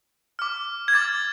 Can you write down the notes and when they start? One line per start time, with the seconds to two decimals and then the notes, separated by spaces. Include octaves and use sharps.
0.39 D6 F6
0.88 G#6
0.93 D6 F6 A6